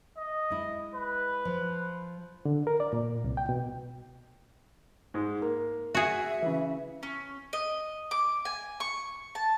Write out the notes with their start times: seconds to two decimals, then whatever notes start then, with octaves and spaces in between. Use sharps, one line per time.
0.17 D#5
0.50 G#3 E4
0.94 B4
1.45 F3
2.45 D3
2.67 A#4
2.80 D5
2.93 A#2
3.24 C2
3.37 G5
3.49 B2
5.14 G#2 G#3
5.42 A#3
5.95 F#4 G#4 E5
6.42 C#3 E3
7.03 C#4
7.53 D#5
8.11 D6
8.45 G#5
8.80 C#6
9.35 A5